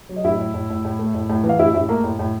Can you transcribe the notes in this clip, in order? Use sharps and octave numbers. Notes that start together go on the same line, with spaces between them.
F#3
D#5
A2 E4 E5
A2
A2
A2
A2
A3
A2
A2
E3
F5
A2 E4 E5
A2 E4 E5
A3 A#3 A#4
A2
A2